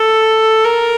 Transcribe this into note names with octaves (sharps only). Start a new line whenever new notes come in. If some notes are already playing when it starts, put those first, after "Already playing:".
Already playing: A4
A#4